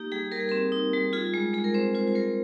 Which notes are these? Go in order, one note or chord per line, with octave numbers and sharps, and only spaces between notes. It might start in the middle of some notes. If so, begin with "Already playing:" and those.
Already playing: A#3 D#4 G4
G3 G#4
G3 A#4
G#4
C4 A#4
D#4
G3
F4 G#4
G#3
G#3 G#4
A#4
C4 C5
F4 C5
C5
G#3 A#4